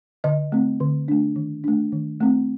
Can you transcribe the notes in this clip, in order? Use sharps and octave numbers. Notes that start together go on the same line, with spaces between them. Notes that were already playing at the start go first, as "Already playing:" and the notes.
D3 D#5
A3 C4
D3
A3 D4
D#3
A3 D4
D#3
A3 C4